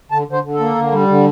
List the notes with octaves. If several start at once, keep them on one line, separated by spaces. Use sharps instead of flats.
D3 A5
D3
C5
D3
A4
A#3
D3
G3
D3